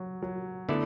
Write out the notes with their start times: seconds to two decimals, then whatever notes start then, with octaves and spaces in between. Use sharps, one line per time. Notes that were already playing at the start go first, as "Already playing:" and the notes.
Already playing: F#3
0.22 F#3
0.68 D3 A3 B3 E4 A4 D5